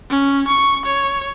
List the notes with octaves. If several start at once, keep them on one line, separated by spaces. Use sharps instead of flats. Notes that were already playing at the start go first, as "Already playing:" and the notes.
C#4
C#6
C#5